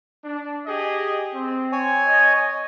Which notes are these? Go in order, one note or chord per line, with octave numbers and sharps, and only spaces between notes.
D4
G4 G#4 D#5
C4
C#5 G#5
D#5